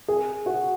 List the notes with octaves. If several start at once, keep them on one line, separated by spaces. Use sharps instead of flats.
G#4
F#4